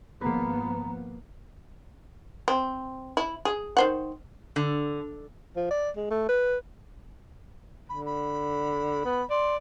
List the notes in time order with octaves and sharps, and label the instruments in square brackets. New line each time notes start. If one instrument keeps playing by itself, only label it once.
[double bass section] G#1 F3 B3 [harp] A#3 B4 [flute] A#5
[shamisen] C4
E4
G#4
D#3 C5 F#5
[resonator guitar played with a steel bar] D3
[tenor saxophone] F3
D5
G#3
A3
B4
[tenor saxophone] D3 [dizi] B5
[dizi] B5
[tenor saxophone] B3
[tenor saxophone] D5 [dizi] C6